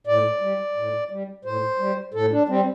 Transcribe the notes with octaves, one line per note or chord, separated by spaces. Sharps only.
A2 D5
G3
A2
G3
A2 C5
G3
A2 A4
D4
G3 C4